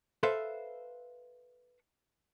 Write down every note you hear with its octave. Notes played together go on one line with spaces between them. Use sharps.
A4 B4 C5 E5 F5